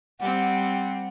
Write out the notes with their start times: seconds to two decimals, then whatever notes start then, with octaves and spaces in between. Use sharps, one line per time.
0.20 G3 C4 F#5